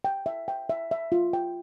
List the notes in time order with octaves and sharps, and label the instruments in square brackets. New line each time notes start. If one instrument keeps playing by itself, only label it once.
[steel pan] G5
E5
G5
E5
E5
F4
G5